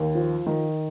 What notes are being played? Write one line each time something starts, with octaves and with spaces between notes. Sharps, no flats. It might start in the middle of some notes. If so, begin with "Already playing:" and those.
Already playing: D#2
F3
D#3